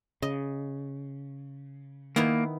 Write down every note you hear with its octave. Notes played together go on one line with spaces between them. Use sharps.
C#3 D#5
D#3 A#3 B3 E4